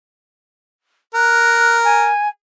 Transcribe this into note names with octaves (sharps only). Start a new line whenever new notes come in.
A#4 F#6
G#5